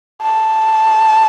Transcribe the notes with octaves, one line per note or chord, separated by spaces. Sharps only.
A5